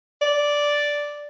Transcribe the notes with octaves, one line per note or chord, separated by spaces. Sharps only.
D5